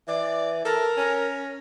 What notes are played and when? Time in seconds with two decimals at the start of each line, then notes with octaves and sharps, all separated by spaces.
0.08 E3 D5
0.65 A4 A#4
0.97 C#4